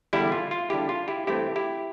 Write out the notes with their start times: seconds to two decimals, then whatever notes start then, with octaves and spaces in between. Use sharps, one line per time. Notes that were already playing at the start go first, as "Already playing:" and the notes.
0.13 E2 D3 G3 D4 E4 G4
0.32 F4
0.51 F4
0.70 E2 D3 G3 D4 E4 G4
0.89 F4
1.08 E4 G4
1.27 G2 E3 A3 C4 E4 G4
1.56 E4 G4